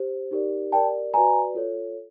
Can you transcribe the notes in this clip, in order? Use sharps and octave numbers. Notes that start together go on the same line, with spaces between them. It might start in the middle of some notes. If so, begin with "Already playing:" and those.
Already playing: G4 C5
D#4 G4 A#4 D5
G4 A#4 D5 G5 A5
F#4 B4 D5 G#5 A#5
F4 A4 C#5